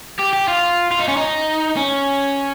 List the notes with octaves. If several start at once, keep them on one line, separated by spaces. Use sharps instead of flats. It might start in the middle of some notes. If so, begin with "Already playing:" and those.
G4
G4
F4
F4
D#4
C#4
D#4
C#4